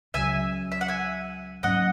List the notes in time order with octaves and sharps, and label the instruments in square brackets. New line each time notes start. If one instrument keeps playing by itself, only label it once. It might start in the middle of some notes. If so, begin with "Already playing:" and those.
[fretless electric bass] C#2 C#3 F#3 [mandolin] E5 G#5
[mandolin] E5
F#5
E5 G#5
[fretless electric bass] G#2 F#3 A#3 C#4 [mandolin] D#5 F#5